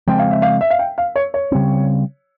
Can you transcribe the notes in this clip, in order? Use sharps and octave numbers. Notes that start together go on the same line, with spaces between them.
C#3 F3 G#3 C4 G5
F5
E5
F5
E5
F5
G5
F5
C#5
C#5
C#3 G3 C4